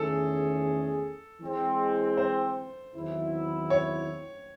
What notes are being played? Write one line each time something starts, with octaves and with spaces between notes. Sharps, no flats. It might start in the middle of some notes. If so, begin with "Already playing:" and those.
Already playing: E2 D#3 A3 C#4 G#4 A4
E3 G#3 C4
C5
E2 D#3 F#3 C4 E4
C#5